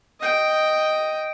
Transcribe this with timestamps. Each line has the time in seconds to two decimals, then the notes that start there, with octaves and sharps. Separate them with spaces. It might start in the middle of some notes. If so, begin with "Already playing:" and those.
0.20 D#5 G5